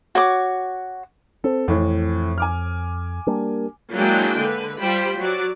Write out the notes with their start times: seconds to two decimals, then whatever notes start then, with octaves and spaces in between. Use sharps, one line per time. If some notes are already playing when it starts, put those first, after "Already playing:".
0.15 F#4 C#5 D6
1.44 C4 A4
1.68 F2 A2 E3
2.38 G#5 D6 F6
3.27 G3 A#3 D4
3.93 F#3 G#3 A#3 D4 E4 G5
4.40 D3 B4
4.79 G3 F4 G4 C5 G5 B5
5.17 F#3 F#4 D5